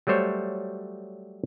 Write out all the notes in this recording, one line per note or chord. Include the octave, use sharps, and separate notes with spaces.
F#3 G3 A3 C5 C#5